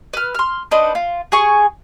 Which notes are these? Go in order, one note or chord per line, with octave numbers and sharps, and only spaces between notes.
B4 F6
C6 F6
D4 D#4 B4 C5
F4
G#4 G#5 C#6